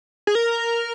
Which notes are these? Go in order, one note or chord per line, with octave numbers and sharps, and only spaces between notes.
G#4
A#4